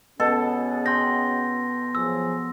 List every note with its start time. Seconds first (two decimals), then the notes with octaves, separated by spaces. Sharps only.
0.20 B2 C#4 F#4 G#4 A4
0.86 G5 C6 A#6
1.95 F3 F#3 G#4 E6